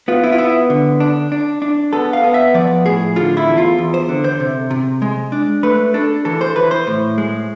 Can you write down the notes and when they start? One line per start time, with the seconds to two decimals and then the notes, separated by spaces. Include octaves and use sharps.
0.08 B3 F4
0.24 E4
0.32 F4
0.38 B3 E4
0.70 D3
1.00 D4
1.32 D4
1.62 D4
1.93 B3 A4
2.13 F5
2.24 B3
2.34 E5
2.54 F3 D5
2.86 A2 G#4
3.16 D3 F4
3.37 E4
3.48 E2
3.58 F4
3.78 E2
3.94 C5
4.09 D3
4.24 C5
4.40 C3
4.70 C3
5.02 G#3
5.32 D4
5.63 A3 B4
5.94 D4 A4
6.25 E3 A4
6.41 C5
6.56 E3 B4
6.71 C5
6.87 A2
7.18 G#3